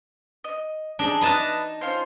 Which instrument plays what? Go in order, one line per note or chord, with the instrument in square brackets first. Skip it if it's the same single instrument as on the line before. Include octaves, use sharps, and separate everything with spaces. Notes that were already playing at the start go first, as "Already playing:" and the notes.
[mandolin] D#5
[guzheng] D4 [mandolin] D#4 G#4 A4
[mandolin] B3 F#6 [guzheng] D#4 D#5 A5
[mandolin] C#4 F4 C5